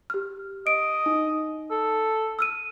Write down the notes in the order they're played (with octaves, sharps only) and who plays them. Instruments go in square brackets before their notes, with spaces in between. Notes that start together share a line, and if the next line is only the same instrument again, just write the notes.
[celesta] G4 F6
[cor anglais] D#5 [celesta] D7
[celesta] D#4
[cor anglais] A4
[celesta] E6 F6 D#7